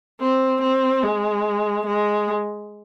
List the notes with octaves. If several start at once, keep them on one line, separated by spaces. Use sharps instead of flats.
C4
C4
G#3
G#3